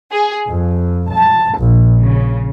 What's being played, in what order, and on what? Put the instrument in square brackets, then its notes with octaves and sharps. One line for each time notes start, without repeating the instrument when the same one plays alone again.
[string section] G#4
F2
A5
A#1
C#3